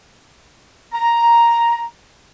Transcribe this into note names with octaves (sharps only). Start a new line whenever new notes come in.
A#5